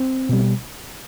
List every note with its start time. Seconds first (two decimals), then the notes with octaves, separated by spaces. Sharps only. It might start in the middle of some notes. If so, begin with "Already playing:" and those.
Already playing: C4
0.29 B2 G3